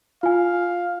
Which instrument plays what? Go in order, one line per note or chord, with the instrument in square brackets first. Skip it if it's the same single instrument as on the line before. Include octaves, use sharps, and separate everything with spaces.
[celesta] F4 G#5 [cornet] F5